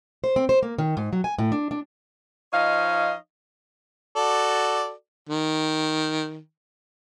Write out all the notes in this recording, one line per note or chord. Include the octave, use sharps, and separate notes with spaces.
C5
C4
C5
A#3
D#3
G#2
F#3
G#5
A2
D4
D4
F3 D#4 C#5 D#5 F5
F#4 A4 D5
D#3